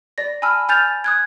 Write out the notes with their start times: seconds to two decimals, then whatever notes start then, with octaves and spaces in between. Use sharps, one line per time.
0.18 D5 A#6
0.42 G#5 A5 B5 E6 F6
0.69 G#5 F6 G6 A6 F7
1.04 D#6 F#6 G#6